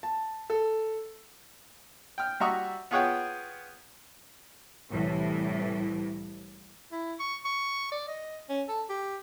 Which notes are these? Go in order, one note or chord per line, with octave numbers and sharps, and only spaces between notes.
A5
A4
G5 F6
G3 F#4 E5 A#5 C#6 D#6
B3 F4 G#4 C#5 F#5 G5
C2 A2 E3
E4
C#6
C#6
D5
D#5
C#4
A4
G4